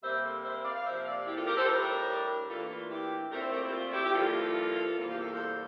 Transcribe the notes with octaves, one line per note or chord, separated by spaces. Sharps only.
C3 G3 A#3 C5 E5
A4 C5
C5 E5
D5 F5
F5
C3 F3 A#3 C5 E5
D5 F5
E4 G4
F4 A4
G4 A#4
A4 C5
A2 G3 D4 G4 A#4
A2 E3 A#3 D4 F4 A4
F4
E4 G4
A#2 A3 C4 E4 G4 A#4
A4 C5
G4 A#4
E4
F4
E4 G4
G4
G2 F3 A#3 E4 F4 A4
E2 C3 G3 A#3 F4
G4
A4
A#4
A4 C5